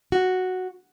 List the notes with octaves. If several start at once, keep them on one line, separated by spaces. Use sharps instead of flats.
F#4